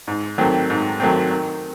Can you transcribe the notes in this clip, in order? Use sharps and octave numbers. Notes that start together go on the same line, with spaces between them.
G#2
D#3 F#3 A3 C4
G#2
D#3 F#3 A3 C4
D#3